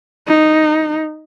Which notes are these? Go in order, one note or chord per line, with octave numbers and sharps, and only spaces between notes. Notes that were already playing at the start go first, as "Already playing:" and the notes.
D#4